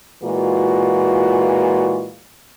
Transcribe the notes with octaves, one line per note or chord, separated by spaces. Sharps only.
A#2 E3 G#3 F4 F#4